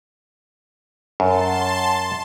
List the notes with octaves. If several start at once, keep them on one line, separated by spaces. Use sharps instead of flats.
F#2 A5 C6